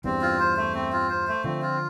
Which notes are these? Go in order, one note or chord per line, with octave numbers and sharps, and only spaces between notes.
E2 G2 C4
F4
C5
A3
C4
F4
C5
A3
D3 F3 C4
F4